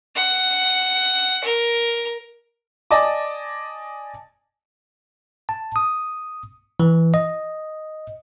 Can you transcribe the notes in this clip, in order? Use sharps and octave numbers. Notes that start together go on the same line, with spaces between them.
F#5
A#4
D5 D#5 G#5 A5 D6
A5
D#6
E3
D#5